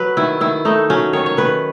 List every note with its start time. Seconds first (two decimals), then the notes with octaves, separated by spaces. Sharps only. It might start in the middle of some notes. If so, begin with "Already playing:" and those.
Already playing: F#3 B4
0.17 D#3 E4
0.41 D#3 E4
0.65 A3 D#4
0.90 F#3 C#4
1.13 D#3 C#5
1.26 C#5
1.37 D#3 B4